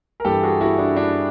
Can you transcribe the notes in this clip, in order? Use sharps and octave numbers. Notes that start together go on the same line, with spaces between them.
A#4
G2 E3 G4 A4
F#4 G#4
E4 F#4
D4 E4
D4 E4